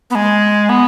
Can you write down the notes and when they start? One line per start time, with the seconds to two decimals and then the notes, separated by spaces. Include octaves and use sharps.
0.10 B3
0.15 G#3
0.69 B3